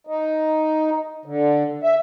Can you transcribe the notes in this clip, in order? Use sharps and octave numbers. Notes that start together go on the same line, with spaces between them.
D#4
D3
E5